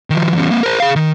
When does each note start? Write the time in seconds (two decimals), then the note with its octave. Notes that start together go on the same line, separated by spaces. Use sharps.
0.10 D#3 F3
0.34 E2 C#4
0.51 A#3 C4
0.63 A#4 C5
0.80 G#4 F5
0.96 D#3